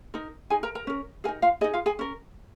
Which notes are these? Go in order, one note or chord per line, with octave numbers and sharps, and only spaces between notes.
D#4 A#4
D#4 G#4 G#5
A#4 A#5
A#4 A#5
C#4 A#4
D#4 G#4 A#4 G#5
F4 F5
D#4 G#4 D#5
F4 F5
G#4 G#5
C#4 A#4